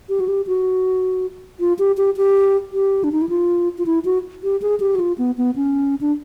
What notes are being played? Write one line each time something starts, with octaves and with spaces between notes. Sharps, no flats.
G4
F#4
G4
F#4
F4
G4
G4
G4
G4
D4
D#4
E4
F4
F4
E4
F#4
G4
G#4
G4
F#4
F4
B3
B3
C#4
D4